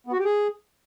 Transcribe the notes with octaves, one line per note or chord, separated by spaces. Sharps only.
B3
F#4
G4
G#4